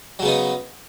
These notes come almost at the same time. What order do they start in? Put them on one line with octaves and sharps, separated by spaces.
F#3 C#3 B3 D#4